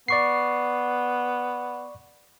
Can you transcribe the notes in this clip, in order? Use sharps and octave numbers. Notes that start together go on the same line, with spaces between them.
B3 D5 C#6 C7